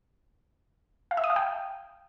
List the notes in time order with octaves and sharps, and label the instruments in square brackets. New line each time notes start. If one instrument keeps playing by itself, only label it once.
[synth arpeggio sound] F5
E5
D#6
F5
G5